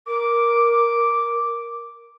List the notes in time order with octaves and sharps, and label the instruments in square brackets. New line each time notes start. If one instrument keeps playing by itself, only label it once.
[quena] A#4 [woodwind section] D6